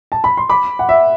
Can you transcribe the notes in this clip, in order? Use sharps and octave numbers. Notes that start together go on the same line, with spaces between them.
A5
B5
C6
B5 D6
F#5
E5